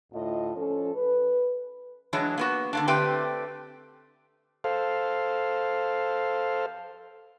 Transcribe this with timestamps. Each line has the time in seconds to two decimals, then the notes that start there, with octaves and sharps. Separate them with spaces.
0.13 D2 A2 F4 D#5
0.56 F3 C#4 A4
0.95 B4
2.13 E3 F#3 G#3 D4 C#5
2.38 A#3 B3 F#4
2.73 D3 A#3 D4
2.88 D3 A3 C4 G4 B4 G5
4.64 A4 C5 F5